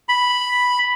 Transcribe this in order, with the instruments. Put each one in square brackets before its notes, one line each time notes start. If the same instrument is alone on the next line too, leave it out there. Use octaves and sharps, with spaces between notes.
[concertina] B5